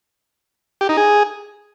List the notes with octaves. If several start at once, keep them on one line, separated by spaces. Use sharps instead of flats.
G4
D#4
G#4